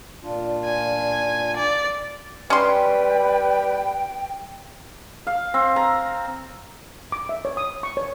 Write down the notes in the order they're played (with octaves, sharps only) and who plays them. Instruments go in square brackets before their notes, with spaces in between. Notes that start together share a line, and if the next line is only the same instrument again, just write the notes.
[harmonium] A#2 D4 F4
[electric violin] G#5
D5
[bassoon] G3 [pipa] C#4 C6 [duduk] B4 [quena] G5
[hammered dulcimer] F5
C4
A#5
[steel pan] D6
E5
C#5
D#6
C#6
C#5